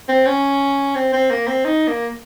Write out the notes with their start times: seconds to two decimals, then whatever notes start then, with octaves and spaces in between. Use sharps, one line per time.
0.09 C4
0.26 C#4
0.95 C4
1.13 C4
1.30 A#3
1.47 C4
1.65 D#4
1.88 A#3